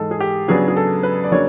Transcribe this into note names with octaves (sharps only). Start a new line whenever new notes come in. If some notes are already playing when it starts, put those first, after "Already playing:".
Already playing: G#2 E3 G#3 A4
G#4
G4
C#3 F#3 B3 D4 G#4
G#4
A4
B4
D5
C#3 F#3 A#3 D4 C#5